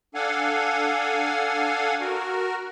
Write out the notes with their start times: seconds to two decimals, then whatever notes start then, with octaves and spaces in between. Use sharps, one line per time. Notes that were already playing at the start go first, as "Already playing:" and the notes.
0.15 D4 A4 F5 F#5 G#5
2.01 F#4 A#4